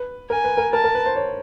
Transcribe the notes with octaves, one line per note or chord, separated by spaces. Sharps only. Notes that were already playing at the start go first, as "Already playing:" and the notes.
Already playing: B4
A#4 G#5
B4
A#4
A#4 A5
A#4
B4
C5
C#5